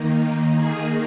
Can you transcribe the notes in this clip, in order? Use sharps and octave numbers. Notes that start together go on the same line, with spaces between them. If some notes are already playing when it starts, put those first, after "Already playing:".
Already playing: D#3 A#3 D#4
G#4